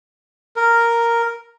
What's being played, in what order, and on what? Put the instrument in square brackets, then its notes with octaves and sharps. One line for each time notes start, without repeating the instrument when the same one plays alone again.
[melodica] A#4